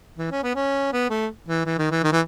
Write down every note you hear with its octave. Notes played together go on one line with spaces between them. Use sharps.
E3
C#4
B3
C#4
B3
A3
E3
E3
D#3
E3
D#3
E3